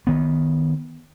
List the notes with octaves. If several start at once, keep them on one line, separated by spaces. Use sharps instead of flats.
D#3 B3